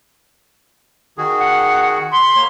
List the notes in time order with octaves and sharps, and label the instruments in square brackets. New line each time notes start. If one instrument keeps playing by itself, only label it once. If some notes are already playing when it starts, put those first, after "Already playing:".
[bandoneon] D#3 F#4 G#4
[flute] F#5
[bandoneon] B5 [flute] C6
[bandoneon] A#3 C#5